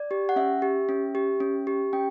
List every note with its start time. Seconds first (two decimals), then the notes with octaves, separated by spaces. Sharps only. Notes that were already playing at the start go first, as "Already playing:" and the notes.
Already playing: D5
0.11 G4
0.29 F#5
0.36 C#4 E5
0.62 G4
0.89 C#4
1.15 G4
1.40 C#4
1.67 G4
1.93 C#4 G5